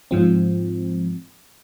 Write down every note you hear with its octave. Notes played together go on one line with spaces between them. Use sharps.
G#2 F3 C4